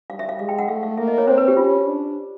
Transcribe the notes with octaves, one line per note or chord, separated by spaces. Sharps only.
G3 F5
E5
F5
G#3 F5
G5
F#5
A3 F5
F5
A#3 E5
D#5
C#5
C4 C5
B4
G4
C#4 F4
D4